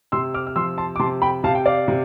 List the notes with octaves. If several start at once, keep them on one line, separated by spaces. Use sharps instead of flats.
C3 C6 E6
D6 F6
F6
F3 C6 E6
A5 C6
D6
C3 A5 C6
G5 B5
C3 F5 A5
G5
D5 F5
C3